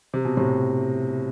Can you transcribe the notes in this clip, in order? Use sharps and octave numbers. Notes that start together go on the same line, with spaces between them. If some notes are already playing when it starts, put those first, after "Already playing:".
C3
B2
A2 C3